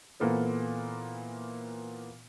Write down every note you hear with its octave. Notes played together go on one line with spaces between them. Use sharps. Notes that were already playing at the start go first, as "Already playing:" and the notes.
A#2 E3 A#3 B3 A4 C5